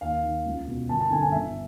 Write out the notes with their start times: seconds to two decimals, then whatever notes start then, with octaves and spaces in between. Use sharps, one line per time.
0.01 D#2 F5
0.23 D#3
0.46 C#2
0.67 B2
0.89 G1 A5
1.00 A5
1.10 F#2 D3 G#5
1.22 G#5
1.32 G1 E5